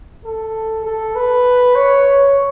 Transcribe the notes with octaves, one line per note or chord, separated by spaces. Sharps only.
A4
A4
B4
C#5